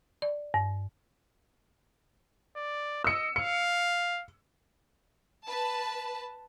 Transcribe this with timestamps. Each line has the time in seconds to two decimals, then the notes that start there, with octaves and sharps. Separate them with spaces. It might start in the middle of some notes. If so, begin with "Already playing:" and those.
0.22 D5
0.54 G2
2.56 D5
3.04 D#5 E6 C#7
3.36 F5 C#7
5.45 B4 A5